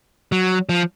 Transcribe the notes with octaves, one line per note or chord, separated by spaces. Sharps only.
F#3
F3